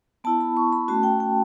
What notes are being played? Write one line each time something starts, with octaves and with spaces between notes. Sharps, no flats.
B3 E4 A5
B5
C#6
B5
A3 C#4 F#4 A5
G5
G5